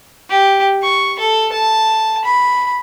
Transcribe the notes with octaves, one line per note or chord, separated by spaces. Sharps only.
G4
C#6
A4
A5
B5